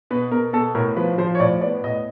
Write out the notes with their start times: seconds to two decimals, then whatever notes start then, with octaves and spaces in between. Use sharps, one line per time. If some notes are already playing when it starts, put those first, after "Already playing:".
0.11 B2 B4
0.31 B2 A#4
0.53 B2 A4
0.75 A2 A#4
0.96 F3 B4
1.18 F3 C5
1.35 C#5
1.40 A2 D5
1.61 B3 D5
1.84 A2 D#5